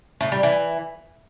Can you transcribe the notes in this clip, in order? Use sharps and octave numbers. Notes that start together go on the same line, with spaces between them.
A2
G3
E3